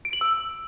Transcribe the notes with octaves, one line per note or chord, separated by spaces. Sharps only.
D7
F#7
E6